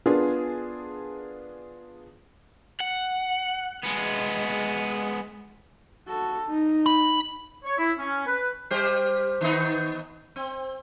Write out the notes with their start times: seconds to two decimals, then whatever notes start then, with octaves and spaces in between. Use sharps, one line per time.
0.06 B3 D4 F4 G#4 A#4
2.80 F#5
3.84 G#3 B3
6.08 F#4 A4
6.47 D#4
6.86 B5
7.64 C#5
7.78 E4
7.98 C#4
8.26 B4
8.71 G3 G4 C5
9.41 D#3 B3 D#4
10.36 C4